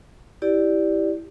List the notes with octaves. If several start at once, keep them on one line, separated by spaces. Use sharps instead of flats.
E4 G4 D5